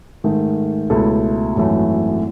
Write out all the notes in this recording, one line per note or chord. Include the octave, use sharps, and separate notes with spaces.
G#2 D#3 A3
C#2 B2 A3 E4 A4
G#1 F#2 E3 A3